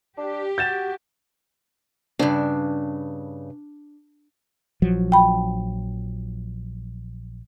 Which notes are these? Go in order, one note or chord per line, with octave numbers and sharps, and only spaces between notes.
D4 G4
F#4 G6 A6 E7
G2 C#3 D4
A#1 F3 F#3
G5 B5